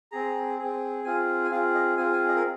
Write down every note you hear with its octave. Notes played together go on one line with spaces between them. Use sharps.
C4 G#4 A#5
C4 G#4
C4 F4 G#4 G#5
G#5
C4 F4 G#4 F5
D#5
C4 F4 G#4 G#5
G#5
D#5
A#4